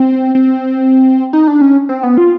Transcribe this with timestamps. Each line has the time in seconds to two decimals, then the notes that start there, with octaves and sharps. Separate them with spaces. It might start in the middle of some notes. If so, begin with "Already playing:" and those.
Already playing: C4
0.35 C4
1.33 D#4
1.48 D4
1.61 C#4
1.89 C4
2.03 B3
2.17 F4